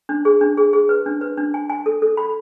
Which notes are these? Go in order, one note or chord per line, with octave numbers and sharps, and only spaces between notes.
D4
G#4
D4
G#4
G#4
B4
D4
B4
D4
G#5
G#5
A4
A4
B5